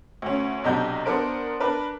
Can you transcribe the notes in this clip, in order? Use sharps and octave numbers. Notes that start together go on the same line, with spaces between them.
D2 C#4
B1 C3 D4 D#5 A#5 G6
B3 D4 A#4 C5 D7
D4 A#4 B4